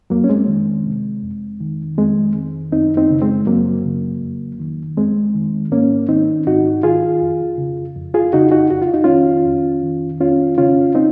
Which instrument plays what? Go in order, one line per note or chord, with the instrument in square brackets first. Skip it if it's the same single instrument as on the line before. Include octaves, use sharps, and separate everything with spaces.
[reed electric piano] F2 F#3 A#3
C#4
G#3 C4
D#3
C3
F2
D#3
F2 G#3 C4
D#3
F#2 C4 D#4
C4 D#4
C#3
G#3 C4
F#2 F#3 A#3
C#3
F2
D#3
F2 G#3 C4
D#3
G#2 A#3 C#4
D#3 C4 D#4
G#2 D#4 F#4
D#3 F4 G#4
F2
C#3
F2
F4 G#4
C#3 D#4 F#4
D#4 F#4
F2 F#4
F4
D#4
D#3 C#4 F4
F2
D#3
F2 C#4 F4
C#3 C#4 F4
C4 D#4